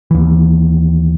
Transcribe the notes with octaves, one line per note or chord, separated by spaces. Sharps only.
D#2 E3